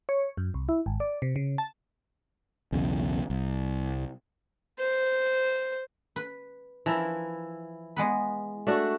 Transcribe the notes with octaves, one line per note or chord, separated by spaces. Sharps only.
C#5
F#2
C2
E4
G#1
D5
C3
C#3
A5
B1 E2 C#3
C2
C5
B4
E3 F3 E4 A#4
G#3 B3 B4
A3 D4 F#4